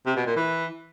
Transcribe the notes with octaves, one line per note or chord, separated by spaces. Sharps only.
C3
B2
A#2
E3